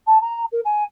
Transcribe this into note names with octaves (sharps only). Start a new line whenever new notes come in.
A5
A#5
A#4
G#5